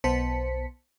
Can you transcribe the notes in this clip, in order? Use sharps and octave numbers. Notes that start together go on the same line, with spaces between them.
B1 B3 C5 A5 B6 C#7